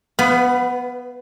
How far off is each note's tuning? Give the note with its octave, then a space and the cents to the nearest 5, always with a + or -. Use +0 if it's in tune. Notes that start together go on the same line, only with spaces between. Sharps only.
B3 +0 B4 +30 F5 +0